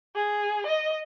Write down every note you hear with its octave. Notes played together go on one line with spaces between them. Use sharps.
G#4
D#5